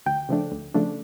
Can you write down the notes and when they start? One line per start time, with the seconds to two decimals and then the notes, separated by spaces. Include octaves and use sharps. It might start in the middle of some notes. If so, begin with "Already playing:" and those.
0.06 D2 G5
0.29 C#3 F3 A3 D4
0.52 D2
0.74 C#3 F3 A3 D4